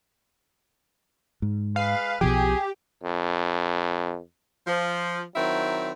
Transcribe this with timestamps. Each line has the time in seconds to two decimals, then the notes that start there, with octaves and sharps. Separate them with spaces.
1.42 G#2
1.76 G#3 B4 F5
2.21 B1 B2 F3 G4 G#4
3.03 F2
4.67 F3
5.36 D#3 F#3 C4 E4